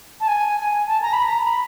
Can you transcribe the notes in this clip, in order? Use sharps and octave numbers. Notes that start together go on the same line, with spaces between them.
A5
G#5
A5
A#5
B5
A#5
B5